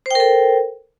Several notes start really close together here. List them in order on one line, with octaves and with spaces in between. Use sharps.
C5 G5 A#4 A4